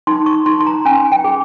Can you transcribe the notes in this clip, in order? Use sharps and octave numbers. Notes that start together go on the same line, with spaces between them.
D#4 C6
C#6
D#4 C6
C6
A#5
C#4 G#5
G5
G#4